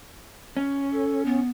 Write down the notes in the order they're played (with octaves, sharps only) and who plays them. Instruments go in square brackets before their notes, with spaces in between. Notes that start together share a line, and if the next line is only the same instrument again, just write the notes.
[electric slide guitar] C#4
[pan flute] A4
B3